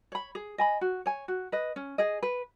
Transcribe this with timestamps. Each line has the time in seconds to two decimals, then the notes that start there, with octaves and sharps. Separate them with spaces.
0.12 C#5 B5
0.35 G#4
0.58 D#5 G#5 B5
0.81 F#4
1.06 C#5 G#5
1.28 F#4
1.52 B4 D#5
1.76 C#4
1.98 G#4 D#5
2.23 B4